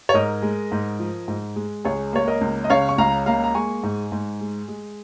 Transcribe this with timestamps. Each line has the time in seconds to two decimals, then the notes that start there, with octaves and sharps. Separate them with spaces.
0.09 C#5
0.14 G#2 A#4 D#5
0.42 G#3
0.72 G#2
0.99 F3
1.28 G#2
1.56 G#3
1.85 C#2 G#4 C#5
2.13 A#3 C#5
2.28 A#4 D#5
2.41 C#2
2.64 D#5
2.70 C#3 C#5 F5
2.89 C#6
2.98 C#2 F5 A#5
3.26 A#3 F5 A#5
3.44 A#5
3.55 G#3 G#5 C#6
3.83 G#2
4.12 G#2
4.41 G#3
4.68 G#3